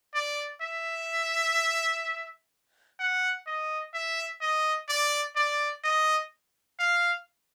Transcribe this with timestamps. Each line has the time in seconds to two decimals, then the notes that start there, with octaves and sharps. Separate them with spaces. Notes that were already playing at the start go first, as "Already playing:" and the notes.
0.15 D5
0.62 E5
3.00 F#5
3.47 D#5
3.94 E5
4.41 D#5
4.89 D5
5.36 D5
5.84 D#5
6.79 F5